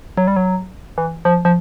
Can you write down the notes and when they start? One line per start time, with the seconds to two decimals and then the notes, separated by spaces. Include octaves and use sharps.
0.17 F#3
0.27 G3
0.36 F#3
0.98 E3
1.25 F3
1.45 F3